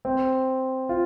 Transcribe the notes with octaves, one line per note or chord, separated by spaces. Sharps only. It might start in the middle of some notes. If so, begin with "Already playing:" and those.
C4
F4